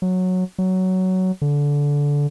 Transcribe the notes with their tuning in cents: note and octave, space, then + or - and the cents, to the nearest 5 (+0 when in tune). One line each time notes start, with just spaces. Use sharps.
F#3 -10
F#3 +10
D3 -20